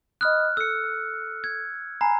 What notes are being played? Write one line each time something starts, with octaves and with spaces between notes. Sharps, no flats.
D#5 B5 D#6 F6 F#6
A4 E6 C#7
G#6
G#5 A#5 B5 C7